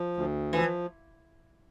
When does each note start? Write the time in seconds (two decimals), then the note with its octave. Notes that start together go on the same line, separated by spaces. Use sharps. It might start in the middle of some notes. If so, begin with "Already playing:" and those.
Already playing: F3
0.17 D2
0.53 E3 F3